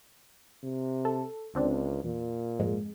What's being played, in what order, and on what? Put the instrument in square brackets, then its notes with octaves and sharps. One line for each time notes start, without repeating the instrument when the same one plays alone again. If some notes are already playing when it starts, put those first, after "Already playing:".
[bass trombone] C3
[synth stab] A4
[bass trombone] C#2 [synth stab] D3 C4 D4
[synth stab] E2 [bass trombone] A#2
[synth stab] F2 G#2 G#3